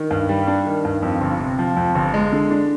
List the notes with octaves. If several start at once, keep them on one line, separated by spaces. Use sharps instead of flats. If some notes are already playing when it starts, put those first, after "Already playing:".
Already playing: D#3
G2
G3
D4
D#3
G2
F2
G1
C3
F3
F2
G1
G#3
D3
D4